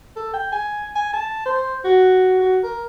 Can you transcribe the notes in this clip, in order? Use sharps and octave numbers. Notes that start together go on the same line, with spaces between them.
A4
G5
G#5
G#5
A5
C5
F#4
F#4
A#4